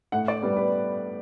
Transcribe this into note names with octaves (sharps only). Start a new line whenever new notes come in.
A2 F#5
D5
G3 B3
B4